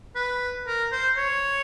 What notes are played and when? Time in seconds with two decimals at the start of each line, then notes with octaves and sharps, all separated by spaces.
0.16 B4
0.67 A#4
0.92 C5
1.17 C#5